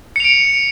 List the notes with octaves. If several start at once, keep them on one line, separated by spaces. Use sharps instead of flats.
C#7 D7 F7